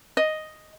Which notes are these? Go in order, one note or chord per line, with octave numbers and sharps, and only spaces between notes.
D#5